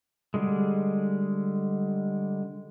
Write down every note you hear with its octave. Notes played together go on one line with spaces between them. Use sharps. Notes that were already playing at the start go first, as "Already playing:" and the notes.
D3 G3 G#3